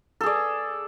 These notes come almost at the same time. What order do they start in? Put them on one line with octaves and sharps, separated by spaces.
A4 G#4 D5